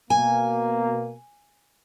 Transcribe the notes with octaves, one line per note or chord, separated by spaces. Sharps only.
B2 A#3 G#5